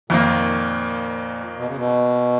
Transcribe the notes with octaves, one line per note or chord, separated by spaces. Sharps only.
F2 A#2 D#3 A#3
B2
C#3
B2